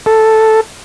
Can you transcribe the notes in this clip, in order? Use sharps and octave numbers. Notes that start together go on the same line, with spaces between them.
A4